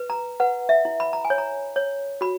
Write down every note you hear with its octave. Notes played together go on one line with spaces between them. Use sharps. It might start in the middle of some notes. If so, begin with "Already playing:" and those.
Already playing: B4
A#5
B4 F#5
E5
E4
B5
A#5
G#5
C#5
A#5
C#5
F#4 B5